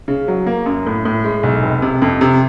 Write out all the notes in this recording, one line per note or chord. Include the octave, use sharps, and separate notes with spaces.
C#3
F#3
A#3
F#2
A2
A2
G#3
B1
F1
C3
F2
C3